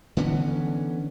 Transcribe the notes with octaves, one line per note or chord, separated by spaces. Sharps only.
D3 E3 B3 C#4